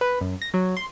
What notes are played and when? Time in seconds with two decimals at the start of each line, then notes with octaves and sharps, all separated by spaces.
0.01 B4
0.21 F#2
0.42 A#6
0.54 F#3
0.77 C6